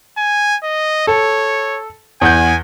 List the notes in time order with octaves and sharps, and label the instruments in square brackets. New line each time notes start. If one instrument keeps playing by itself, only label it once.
[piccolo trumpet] G#5
D#5
[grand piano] A4 [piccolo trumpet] C#5
[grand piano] E2 F#5 G6 [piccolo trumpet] G#5